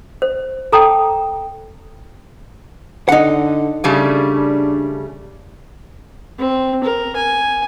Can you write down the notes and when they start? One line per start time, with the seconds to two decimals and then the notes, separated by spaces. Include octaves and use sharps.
0.22 C5
0.72 A4 G5 A5 A#5 D#6
3.09 D3 D#4 F#5
3.84 C#3 G3 A3 D4
6.38 C4
6.84 A#4
7.16 G#5